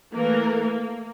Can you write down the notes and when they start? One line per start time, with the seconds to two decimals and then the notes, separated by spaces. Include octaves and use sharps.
0.14 E3 A3 A#3 A4 A#4
0.60 A#3